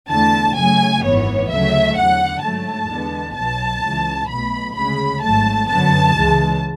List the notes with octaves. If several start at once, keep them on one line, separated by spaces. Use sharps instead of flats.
E2 D3 A3 A5
F#2 C#3 F#3 A3 G#5
G#1 F#2 E3 B3 C#5
D2 C#3 F#3 A3 E5
E2 D3 F#3 F#5
G#2 F#3 A3 A5
E2 D3 G#3 B3
B1 B2 F#3 A5
C#2 C#3 E3
B1 B2 A3 B5
D2 C#3 G#3 B5
G#1 G#2 F#3 A3 A5
F#2 D3 F#3 B3 A5
C#2 C#3 E3 G#3